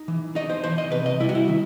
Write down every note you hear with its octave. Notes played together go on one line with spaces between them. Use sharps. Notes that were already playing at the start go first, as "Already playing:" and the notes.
Already playing: D#4
E3
D#4 D#5
C5
E3 C5
D#5
C3 B4
D#5
G3 E4
F#4
E4
D#3